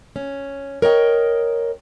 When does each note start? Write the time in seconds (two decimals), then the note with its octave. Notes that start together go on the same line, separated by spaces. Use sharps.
0.16 C#4
0.82 A#4 C#5 D#5 G5